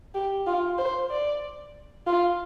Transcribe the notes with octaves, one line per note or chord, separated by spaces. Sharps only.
G4
F4
C5
D5
F4